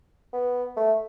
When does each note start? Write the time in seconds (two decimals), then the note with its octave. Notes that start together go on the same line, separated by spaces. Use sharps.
0.33 B3
0.77 A3